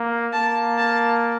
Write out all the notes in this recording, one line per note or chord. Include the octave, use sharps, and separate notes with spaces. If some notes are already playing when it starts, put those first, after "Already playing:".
Already playing: A#3
A#3 A5
A5